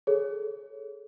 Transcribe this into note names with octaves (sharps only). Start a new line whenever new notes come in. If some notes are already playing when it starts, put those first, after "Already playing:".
G#4 A4 C#5